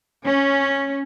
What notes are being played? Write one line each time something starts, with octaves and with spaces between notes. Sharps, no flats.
C#4